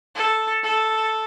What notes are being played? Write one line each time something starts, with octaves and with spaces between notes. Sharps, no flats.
A4
A4